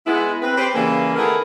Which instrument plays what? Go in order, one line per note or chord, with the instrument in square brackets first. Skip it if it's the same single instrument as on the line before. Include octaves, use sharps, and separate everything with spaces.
[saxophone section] G#3 B3 E4
C4 B4
C4 G4 B4 C5
C#3 E3 G3 A#3
D#3 A3 B3 E4 G#4 A#4